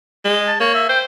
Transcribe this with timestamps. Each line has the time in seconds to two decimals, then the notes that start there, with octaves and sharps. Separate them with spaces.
0.25 G#3
0.48 A5
0.60 A#3 C#5
0.74 E5
0.89 C5 G5